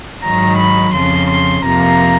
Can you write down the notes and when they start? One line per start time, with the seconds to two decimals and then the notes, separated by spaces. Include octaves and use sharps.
0.22 G#2 D#3 F#3 A#5
0.57 B5
0.93 F2 C#3 F3 C6
1.30 C6
1.64 F2 C3 F3 A#3 A#5